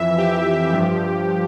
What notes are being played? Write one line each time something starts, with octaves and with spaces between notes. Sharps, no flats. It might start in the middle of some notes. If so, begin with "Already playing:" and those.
Already playing: F2 E3 E5
G4
G2 F3